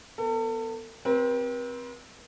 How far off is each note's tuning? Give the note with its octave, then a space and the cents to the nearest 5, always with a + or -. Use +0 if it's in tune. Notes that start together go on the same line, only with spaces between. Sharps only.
B3 +0 A4 +35
C4 +0 G4 +0 B4 -45